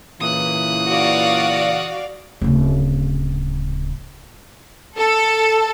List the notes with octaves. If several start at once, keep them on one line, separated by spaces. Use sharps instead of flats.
A#2 C#3 E3 D#6 F#6
F#4 D5 F5
D1 C#3
A4